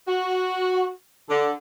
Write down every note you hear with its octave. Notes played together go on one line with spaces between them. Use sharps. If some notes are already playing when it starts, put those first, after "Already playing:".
F#4
D3